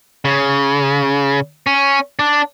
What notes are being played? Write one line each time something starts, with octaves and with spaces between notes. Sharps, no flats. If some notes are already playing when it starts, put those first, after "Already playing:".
C#3
C#4
D4